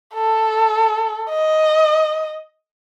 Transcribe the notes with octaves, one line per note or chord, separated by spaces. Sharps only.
A4
D#5